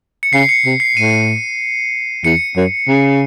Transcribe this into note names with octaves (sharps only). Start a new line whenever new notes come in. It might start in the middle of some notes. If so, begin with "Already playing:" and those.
C#7
C#3 C7
C#7
C3
C7
A2 D#7
E2 C#7
F#2
C#3